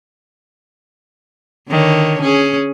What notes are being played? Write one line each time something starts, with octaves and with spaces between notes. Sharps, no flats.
D3 D#3 C#5
C#4 G#4